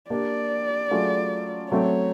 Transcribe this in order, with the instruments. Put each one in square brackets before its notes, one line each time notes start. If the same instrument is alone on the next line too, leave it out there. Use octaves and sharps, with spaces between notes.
[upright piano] A#3 D4 G4 [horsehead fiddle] D5
[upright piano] F#3 A3 C#4 F4 G#4
[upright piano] F#3 A3 C4 [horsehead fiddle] C#5